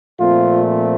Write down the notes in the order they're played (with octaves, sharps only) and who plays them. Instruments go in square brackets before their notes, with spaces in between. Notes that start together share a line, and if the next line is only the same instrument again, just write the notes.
[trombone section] A#2 F3 A3 C4 F4